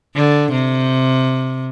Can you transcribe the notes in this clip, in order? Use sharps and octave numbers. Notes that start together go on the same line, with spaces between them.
D3
C3